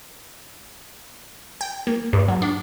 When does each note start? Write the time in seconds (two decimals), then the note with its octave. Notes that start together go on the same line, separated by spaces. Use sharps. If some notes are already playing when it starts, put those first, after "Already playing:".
1.61 G5
1.87 A#3
2.13 G2
2.28 F#3
2.42 D4